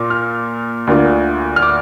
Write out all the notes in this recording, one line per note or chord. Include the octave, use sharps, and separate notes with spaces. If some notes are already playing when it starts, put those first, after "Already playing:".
Already playing: A#2 A#3 F4
F6
D2 D3 A#3 F4
F6
D6